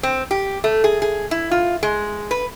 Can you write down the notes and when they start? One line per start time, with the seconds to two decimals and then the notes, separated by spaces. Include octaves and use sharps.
0.03 C4
0.31 G4
0.64 A3
0.84 G#4
1.02 G#4
1.31 E4
1.51 F4
1.83 G#3
2.31 B4